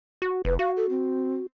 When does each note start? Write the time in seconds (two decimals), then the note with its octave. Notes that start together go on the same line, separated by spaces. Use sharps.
0.22 F#4
0.45 F1 B4
0.59 F#4 F5
0.77 A4
0.90 C4